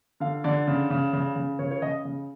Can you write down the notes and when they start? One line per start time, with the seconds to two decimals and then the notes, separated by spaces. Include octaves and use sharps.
0.20 D3 F5
0.44 D3 D5
0.67 C#3
0.90 C#3
1.13 C#3
1.36 C#3
1.59 C#3 C#5
1.71 C#5
1.82 C#3 D#5
2.05 C#3